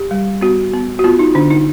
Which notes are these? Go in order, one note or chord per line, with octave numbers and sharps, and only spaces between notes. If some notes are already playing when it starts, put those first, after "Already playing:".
Already playing: G4
G3
B3 F#4
B3
F#4
B3 F4
D#4
D3 D4
D#4